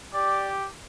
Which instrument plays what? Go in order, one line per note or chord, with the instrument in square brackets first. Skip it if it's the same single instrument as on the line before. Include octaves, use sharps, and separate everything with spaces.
[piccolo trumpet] G4 [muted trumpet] D5